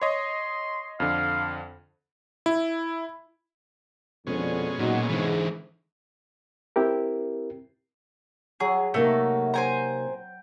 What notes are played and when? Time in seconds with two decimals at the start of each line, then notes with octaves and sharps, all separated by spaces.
0.02 C#5 D#5 C6
1.00 F2 D3 F5
2.46 E4
4.27 F2 B2 D3 G#3 C#4
4.79 A#2 F#3 D#4 F#4
5.09 G#2 D3 E3
6.76 C4 E4 G4 A#4
8.60 F#3 G#4
8.94 C3 A3 A#3 D#4
9.54 C5 G5 G#5 A#5